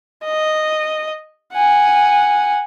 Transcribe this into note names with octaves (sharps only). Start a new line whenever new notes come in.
D#5
F#5 G#5